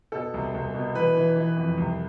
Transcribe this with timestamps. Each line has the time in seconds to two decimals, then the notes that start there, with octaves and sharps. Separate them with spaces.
0.12 B2 A4
0.34 C2
0.54 C2
0.74 B2
0.95 E3 B4
1.17 E3
1.36 E3
1.57 F2
1.77 C2